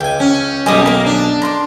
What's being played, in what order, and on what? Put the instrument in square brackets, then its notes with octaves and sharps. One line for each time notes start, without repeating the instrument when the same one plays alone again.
[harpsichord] C#2 G#5 [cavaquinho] G5
[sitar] C#4
[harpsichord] B1 D#5 [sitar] F#2 G3 [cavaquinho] G#5 D6 D#6
[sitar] A#3 [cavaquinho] A#4 D6
[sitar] D4
[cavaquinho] A#4 C6 D6